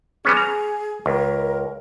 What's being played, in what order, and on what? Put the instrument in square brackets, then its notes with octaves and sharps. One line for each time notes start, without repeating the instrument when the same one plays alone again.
[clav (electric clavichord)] G3 B3 C#4 [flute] G#4
[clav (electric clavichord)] A#5
[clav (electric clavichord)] C#2 [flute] A#4